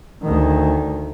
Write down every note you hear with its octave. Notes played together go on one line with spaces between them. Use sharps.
D2 D#3